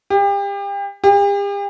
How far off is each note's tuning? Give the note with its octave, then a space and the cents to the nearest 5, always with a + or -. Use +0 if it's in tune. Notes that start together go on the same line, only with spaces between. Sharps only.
G4 +35
G4 +45